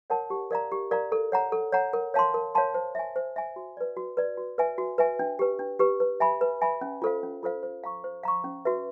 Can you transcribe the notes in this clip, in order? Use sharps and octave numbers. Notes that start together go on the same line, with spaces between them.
A#4 C#5 F#5 A5
G4
A#4 D5 F5 A#5
G4
A#4 D5 F5 A#5
A4
C#5 F#5 A#5
A4
C#5 F#5 A#5
A#4
C#5 F5 A5 C6
A#4
C#5 F5 A5 C6
C5
E5 G#5
C5
E5 G#5
F#4
B4 D5
F#4
B4 D5
F#4
B4 E5 G#5
F#4
B4 E5 G#5
D4
G4 B4
D4
G4 B4
B4
E5 G#5 B5
B4
E5 G#5 B5
C#4
F4 A4 C5 F5
C#4
F4 A4 C5 F5
C5
F5 A#5 C#6
C5
F5 A#5 C#6
C#4
F#4 B4 E5